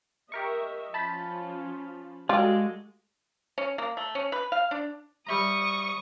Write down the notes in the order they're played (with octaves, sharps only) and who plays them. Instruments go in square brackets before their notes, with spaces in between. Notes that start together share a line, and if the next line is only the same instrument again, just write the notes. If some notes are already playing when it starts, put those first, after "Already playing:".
[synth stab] G4 A#4 C#6 [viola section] D#5 E5
[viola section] F3 C#4 F4 [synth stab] A5 B5 G6
[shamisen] G3 F4 [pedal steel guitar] G#3 [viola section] F#4 A4 [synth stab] D6 F#6
[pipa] C#4
A#3
A3
C#4
B4
F5
D4
[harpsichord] G3 E5 A#5 [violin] C#6 D#6